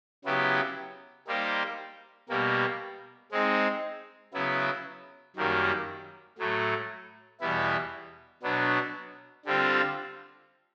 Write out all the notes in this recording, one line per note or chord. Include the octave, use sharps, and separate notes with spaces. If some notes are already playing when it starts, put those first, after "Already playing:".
C#3 F#3 B3 E4 G4
G3 A#3 D#4 G4 C5
B2 G3 A#3
G#3 C4 D#4
C#3 F#3 B3 E4
F#2 D#3 G3 A#3
A2 F#3 A3
E2 B2 G3 B3 E4
B2 F#3 B3 D4
D3 G3 C4 F4